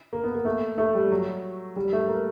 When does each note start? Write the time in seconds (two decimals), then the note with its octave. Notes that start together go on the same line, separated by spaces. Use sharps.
0.13 A#3
0.24 B3
0.35 A#3
0.45 A3
0.78 A3
0.95 G3
1.11 F#3
1.76 G3
1.93 A3
2.08 A#3